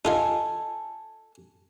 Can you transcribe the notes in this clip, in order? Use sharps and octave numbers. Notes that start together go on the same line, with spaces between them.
D#4 F4 G#4 A4 D#5 G#5